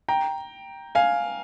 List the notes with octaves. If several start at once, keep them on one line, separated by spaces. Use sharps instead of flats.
G5 A#5
F5 G#5